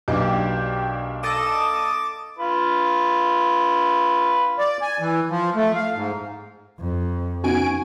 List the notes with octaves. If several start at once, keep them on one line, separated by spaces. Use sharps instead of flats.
B1 A#3 D4 G4
A4 D#5 D6 E7
F4 B4
D5
G#5
E3
F3
A3
F5
G#2
F2
B3 C#4 D#4 F#4 G#5 D7